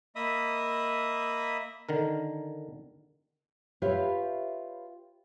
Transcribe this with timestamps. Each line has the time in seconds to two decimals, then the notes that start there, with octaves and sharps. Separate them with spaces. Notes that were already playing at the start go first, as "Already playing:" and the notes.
0.16 A#3 D#5 E5 B5 D#6
1.89 D3 D#3 A#4
3.82 F4 G4 B4 C#5 E5 F5